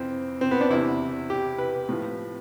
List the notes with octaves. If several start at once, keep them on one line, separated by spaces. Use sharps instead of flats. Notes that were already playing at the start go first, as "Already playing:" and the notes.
Already playing: F2 E3 C4
C4
B3
D4
E2 C3 E3 E4
G4
B4
A2 F3